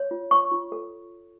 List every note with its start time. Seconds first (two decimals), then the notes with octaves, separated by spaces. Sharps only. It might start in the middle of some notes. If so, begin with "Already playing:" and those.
Already playing: C#5
0.11 F4
0.31 C#5 C#6
0.52 F4
0.72 A4